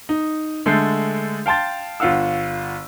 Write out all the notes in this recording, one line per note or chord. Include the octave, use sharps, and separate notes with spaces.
D#4
D3 G#3 A3 A4 G6 C7
F5 G5 A5 C6 A6
G1 F4 F5 F#5 E6